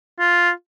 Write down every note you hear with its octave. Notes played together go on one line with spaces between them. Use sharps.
F4